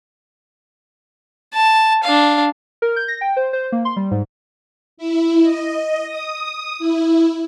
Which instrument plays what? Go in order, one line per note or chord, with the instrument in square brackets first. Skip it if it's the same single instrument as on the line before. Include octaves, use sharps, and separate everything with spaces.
[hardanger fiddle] A5
D4 F5
[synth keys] A#4
G6
A#6
G5
C5
C5
A#3
C6
G3
G#2
[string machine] E4
D#5
D#6
E4